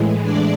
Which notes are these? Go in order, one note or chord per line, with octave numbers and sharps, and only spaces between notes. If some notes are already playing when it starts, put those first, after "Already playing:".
Already playing: A2 E3 G#3
D4 D5